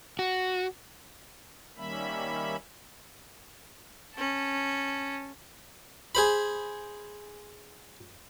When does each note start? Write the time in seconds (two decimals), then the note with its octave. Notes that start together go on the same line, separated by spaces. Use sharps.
0.19 F#4
1.77 D#3 G3 A#3 C#4 E5 B5
4.15 C#4 A5
6.15 G#4 C5 B5